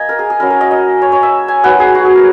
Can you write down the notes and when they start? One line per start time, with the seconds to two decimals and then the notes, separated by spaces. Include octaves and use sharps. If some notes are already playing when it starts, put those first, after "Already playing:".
Already playing: A#3 D#5 G#5
0.09 A#4
0.19 G#4
0.30 G#4
0.40 F#3 C#4 E4 A#4
0.50 A#4
0.61 D#5
0.71 D#5
1.02 C#5
1.12 C#5
1.23 E5
1.48 G#5
1.63 F#3 B3 D#4 F#5
1.80 G#4
1.95 F#4
2.05 G#4
2.15 A#4